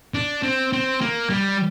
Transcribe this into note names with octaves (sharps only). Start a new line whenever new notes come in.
D4
C4
C4
A#3
G3